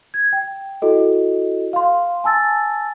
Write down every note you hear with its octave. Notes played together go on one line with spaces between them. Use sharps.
G#6
G5
E4 F#4 A4 D#5
F5 C6
G#5 A5 E6 A6